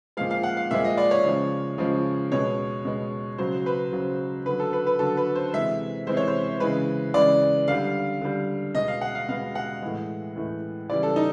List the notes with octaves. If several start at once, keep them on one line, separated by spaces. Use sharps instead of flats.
A#2 F3 G#3 F5
F5
F#5
F5
A#2 F3 G#3 E5
D#5
D5
C#5
C#3 F3 G#3
C#3 F3 G#3
B2 G#3 C#5
B2 G#3
C#3 F#3 C5
B4
C#3 F#3
D3 F#3 B4
A4
B4
B4
D3 F#3 A4
B4
C5
C3 E3 G#3 E5
C3 E3 G#3 C5
C#5
C5
C#3 E3 G#3 B4
C#3 E3 G#3 D5
D3 G3 F5
D3 G3
B2 G#3 D#5
F5
F#5
F5
B2 G#3 F5
F#5
A2 E3 G#3
A2 E3 G#3
C#3 E3 G3 D5
A4
D#4